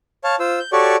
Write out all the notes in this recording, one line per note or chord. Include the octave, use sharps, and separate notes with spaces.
C#5 F5 A5
F4 C5 E6
G6
F#4 G4 A4 C#5 D5 C#6